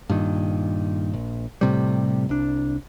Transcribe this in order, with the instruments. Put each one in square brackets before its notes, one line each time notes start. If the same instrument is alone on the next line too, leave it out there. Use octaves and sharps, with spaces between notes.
[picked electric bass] G2 A#2 D#3
A#1
A2 C3 G3
C2 D4